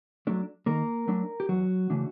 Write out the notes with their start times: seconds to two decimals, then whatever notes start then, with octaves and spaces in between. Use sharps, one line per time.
0.27 F#3 A3 D4
0.66 D#3 A#3 A#4
1.07 F#3 A3 D4
1.40 G4
1.49 E2 F#3 F#4
1.90 C#3 E3 A3 D4